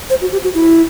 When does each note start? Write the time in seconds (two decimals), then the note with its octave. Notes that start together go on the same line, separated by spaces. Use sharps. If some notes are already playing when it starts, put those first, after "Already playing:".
0.10 C5
0.21 F#4
0.32 G4
0.43 F#4
0.54 E4